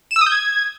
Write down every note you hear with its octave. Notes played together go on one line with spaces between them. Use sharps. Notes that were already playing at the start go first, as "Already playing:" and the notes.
E7
E6
D#6
G6
G#6